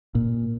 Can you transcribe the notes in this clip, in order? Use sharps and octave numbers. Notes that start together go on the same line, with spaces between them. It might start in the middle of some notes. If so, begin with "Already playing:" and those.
A#2